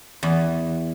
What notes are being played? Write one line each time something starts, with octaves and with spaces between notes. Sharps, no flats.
E2